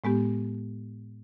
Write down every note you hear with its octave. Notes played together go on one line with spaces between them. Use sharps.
A2 G#3 B3 G4